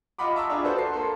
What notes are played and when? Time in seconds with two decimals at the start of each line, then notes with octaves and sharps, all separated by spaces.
0.19 F4 D#5 F#5 B5 D6
0.36 E5 A5 A#5 C#6 D6 E6
0.50 D4 F4 G#4
0.63 F#4 A4 B4 C5
0.75 A5 C6 C7
0.93 A#3 A4